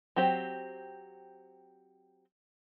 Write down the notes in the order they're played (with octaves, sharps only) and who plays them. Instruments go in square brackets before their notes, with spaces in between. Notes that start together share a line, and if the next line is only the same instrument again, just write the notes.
[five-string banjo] F#3 C4 G4 C5